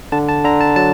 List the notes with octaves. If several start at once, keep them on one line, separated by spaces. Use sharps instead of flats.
D3 A5
A5
D3 A#5
A5
F#3 A5